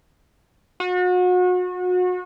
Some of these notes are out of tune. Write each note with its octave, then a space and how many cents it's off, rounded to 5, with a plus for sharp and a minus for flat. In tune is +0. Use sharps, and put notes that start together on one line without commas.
F#4 -35